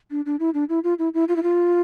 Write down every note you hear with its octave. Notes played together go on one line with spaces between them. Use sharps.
D4
D4
E4
D4
E4
F4
E4
E4
F4
E4
F4